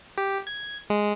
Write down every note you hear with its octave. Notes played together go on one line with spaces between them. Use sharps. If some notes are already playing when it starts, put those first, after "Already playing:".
G4
G#6
G#3